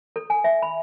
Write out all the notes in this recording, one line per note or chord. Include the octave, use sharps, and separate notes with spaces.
A4
G#5
E5
B5